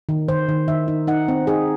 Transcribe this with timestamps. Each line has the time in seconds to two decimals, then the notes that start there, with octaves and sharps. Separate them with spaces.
0.09 D#3
0.28 D#3 C5
0.49 D#3
0.68 D#3 E5
0.88 D#4
1.07 D#4 F#5
1.28 C4
1.47 D#4 G#4